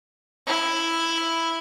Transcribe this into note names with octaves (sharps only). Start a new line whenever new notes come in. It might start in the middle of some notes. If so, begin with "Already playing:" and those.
E4